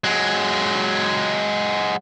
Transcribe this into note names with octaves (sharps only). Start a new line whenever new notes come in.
F#3 G#3